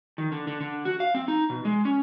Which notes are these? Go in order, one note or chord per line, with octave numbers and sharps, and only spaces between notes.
D#3
D3
D3
D3
F#4
F5
C4
D#4
B2
G#3
C#4